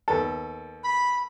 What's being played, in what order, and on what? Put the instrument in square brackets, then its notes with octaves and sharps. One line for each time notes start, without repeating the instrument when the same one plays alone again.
[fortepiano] D#2 B3 A4
[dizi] B5